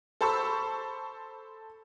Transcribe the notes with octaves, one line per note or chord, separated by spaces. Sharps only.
A4 C5 A5 B5 C#6 E6